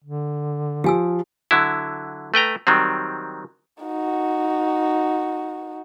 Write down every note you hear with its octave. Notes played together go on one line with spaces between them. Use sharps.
D3
F3 G4 G#5 E6
D3 F#3 E4
A3 B4 G5 A#5
D#3 F#3 G3 C4
D#4 F#4